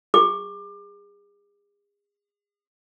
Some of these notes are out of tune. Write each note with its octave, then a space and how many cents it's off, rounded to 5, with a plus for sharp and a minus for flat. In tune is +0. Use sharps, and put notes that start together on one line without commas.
G#4 -35 D6 +25